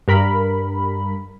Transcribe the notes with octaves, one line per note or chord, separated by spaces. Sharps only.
G2 A#4 B5